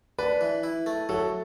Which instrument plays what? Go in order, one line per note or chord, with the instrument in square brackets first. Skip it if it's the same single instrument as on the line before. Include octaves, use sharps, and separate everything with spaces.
[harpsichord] D4 [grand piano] B4
[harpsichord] E3
E4
A3
[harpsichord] F#3 [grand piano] A4